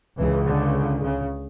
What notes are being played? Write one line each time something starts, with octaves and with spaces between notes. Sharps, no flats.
C#2 C#3 E3
D3
C#3